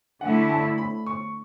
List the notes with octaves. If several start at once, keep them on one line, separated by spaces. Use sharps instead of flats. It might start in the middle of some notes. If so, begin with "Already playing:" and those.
D3 A3 E4 F#5
A5
B5
C#6